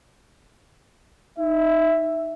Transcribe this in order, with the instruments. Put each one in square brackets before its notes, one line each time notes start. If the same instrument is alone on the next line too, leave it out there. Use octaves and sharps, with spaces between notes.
[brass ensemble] D#4 E5